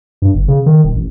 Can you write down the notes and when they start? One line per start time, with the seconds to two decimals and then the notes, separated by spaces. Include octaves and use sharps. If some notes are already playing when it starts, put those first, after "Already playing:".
0.22 G2
0.35 G1
0.48 C#3
0.66 D#3
0.84 D#1
0.96 A1